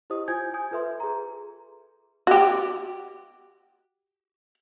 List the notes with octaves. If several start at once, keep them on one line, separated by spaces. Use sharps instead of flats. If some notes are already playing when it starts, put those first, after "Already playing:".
E4 G4 C5 D#5 D#6
F4 C5 G#5 G6 G#6
G#5 D#6 G6
F4 A4 B4 E5 C6
G#4 A#5
F#4 G4